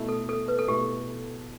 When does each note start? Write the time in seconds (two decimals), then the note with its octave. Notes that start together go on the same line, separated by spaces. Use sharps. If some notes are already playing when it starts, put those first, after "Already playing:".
Already playing: B2 A3 E4
0.09 A4
0.29 A4
0.48 B4
0.59 A4
0.68 B2 A3 E4 G4